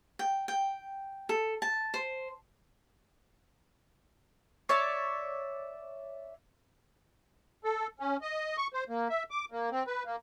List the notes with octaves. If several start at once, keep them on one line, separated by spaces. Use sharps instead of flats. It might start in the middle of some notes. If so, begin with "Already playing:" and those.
G5
G5
A4
A5
C5
C#5 D5 E5
A4
C#4
D#5
C#6
C5
A#3
E5
D6
A#3
C4
B4
A#3